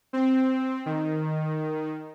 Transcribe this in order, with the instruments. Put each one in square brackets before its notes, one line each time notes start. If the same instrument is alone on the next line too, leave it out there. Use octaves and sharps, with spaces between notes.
[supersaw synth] C4
D#3